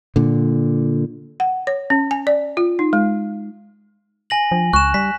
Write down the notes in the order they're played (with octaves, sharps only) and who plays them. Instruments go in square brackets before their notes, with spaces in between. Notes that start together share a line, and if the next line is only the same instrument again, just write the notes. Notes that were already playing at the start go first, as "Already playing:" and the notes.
[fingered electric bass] A#2 D3
[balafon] F#5
C#5
C#4
G#5
D5
F4
D#4
G#3
[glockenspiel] G#5 A#6 F#7
[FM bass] F3 [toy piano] D4
[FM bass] C#2 [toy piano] C#6 [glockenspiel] F#6 E7
[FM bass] G3 [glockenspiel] B6